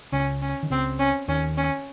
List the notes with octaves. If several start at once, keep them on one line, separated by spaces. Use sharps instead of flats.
C#2 C#3 C#4
C#4
D#3
C#2 C#3 C4
C#4
D#2 D#3 C#4
C#4